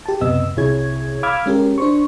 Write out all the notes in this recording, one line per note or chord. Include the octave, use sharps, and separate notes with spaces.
G4 A5
C#2 F#2 C3 B3 D#5 E6
C2 C3 E4 G#4 C#5 G#6
F5 B5 D6 E6 F6 G#6
G#3 C#4 G4 A#4
D4 C5 C#6